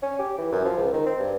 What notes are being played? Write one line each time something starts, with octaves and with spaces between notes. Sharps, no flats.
C#4
G4
E3
F#2
F3
C#2
D#3
C4
G2